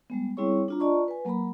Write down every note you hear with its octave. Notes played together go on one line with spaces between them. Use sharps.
G3 G#3 B3
G3 C4 E4 G#4 C#5 C#6
D4 F4 A#5
F4 D5 D#5 A5 A#5 C#6
B4 G#5
F#3 A#3 A#4 A#5 B5